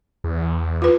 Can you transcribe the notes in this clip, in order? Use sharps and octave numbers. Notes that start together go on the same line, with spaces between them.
E2
F4 B4